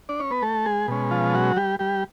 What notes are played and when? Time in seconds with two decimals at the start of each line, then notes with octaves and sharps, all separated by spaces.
0.09 D4 D5
0.19 C#4 C#5
0.31 B3 B4
0.42 A3 A4
0.65 G#3 G#4
0.88 B2 G#3 C#4
1.11 F3 F4
1.34 F#3 F#4
1.56 G3 G4
1.79 G3 G4